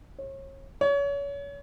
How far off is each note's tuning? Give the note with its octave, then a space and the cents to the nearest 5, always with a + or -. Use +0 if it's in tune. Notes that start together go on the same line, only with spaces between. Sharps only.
C#5 -35
C#5 +30